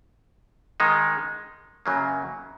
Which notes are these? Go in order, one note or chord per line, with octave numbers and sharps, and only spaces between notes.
D#3 G#3 D#4
F#2 C#3 F#3 A#3